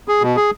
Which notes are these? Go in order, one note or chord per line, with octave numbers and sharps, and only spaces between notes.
G#4
B2
G#4